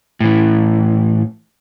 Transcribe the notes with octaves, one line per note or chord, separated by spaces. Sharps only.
A2 E3